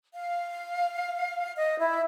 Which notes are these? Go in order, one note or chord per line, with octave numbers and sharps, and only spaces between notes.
F5
D#5
E4